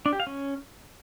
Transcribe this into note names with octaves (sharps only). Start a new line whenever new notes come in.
D4
G4
F5
C#4